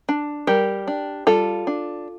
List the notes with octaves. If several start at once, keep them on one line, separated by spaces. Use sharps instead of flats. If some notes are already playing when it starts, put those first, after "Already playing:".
D4
G3 G4 A#4
D4
G3 F4 A4
D4